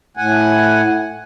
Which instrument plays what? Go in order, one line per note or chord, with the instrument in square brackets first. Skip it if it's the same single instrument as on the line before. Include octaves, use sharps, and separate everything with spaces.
[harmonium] A2 F#5 G#5